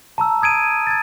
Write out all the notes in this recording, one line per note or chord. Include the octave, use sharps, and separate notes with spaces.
A5 A#5 E6
D#6 G#6 D7 D#7
G#6 A6